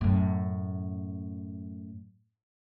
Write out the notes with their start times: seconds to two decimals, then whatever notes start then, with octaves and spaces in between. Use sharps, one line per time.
0.01 F#2 A2